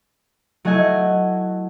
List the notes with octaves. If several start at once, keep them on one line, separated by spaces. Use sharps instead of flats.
F#3 A3 E4 F#4 D#5 G#5